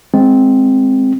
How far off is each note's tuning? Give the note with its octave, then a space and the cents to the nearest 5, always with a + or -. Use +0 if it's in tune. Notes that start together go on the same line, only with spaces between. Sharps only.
G#3 +0 C4 +0